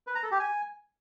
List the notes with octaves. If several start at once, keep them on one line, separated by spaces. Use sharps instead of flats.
B4
A#5
A4
G4
G#5